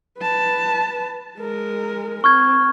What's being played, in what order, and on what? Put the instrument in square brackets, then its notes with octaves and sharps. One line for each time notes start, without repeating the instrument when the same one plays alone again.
[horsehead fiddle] B4 A5
G#3 A#4
[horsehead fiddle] C4 [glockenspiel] C#6 F6 G#6